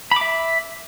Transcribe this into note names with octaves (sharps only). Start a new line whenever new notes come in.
E5 B5 D6